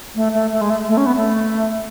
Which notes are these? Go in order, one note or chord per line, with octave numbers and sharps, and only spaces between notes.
A3
A3
A3
G#3
A3
A3
C#4
B3
A3